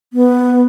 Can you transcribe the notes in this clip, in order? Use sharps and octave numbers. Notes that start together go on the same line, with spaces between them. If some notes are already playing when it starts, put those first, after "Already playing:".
B3